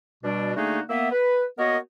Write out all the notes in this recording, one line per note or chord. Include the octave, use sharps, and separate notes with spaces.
B2 G3 D4
D3 A3 A#3 D#4 F#4 G#4
A#3 B3 E5
B4
A#3 B3 F#4 A#4 C#5 D#5